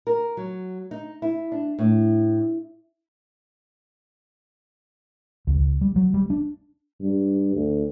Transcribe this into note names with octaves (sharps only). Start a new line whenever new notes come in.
A#4
F#3
D#4
E4
D4
A2
C#2
C#2
G3
F#3
G3
D4
G2
D2